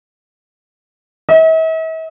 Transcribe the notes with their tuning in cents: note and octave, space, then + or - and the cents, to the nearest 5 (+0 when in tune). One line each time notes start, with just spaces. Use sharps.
E5 -45